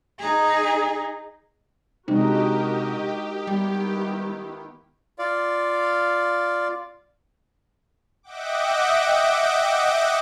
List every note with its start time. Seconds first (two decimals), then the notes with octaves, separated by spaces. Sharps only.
0.19 D#4 G#4
2.08 C3 G#3 D4 D#4 F#4 G4 A#4 D#5
3.47 D#3 G3 B3 E4
5.19 F4 D5 F5
8.23 D#5 E5 F#5 G5 D6